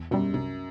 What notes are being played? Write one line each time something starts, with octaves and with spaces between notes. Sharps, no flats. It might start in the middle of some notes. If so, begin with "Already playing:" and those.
Already playing: E2
F#2 B2 G3
C2 F#2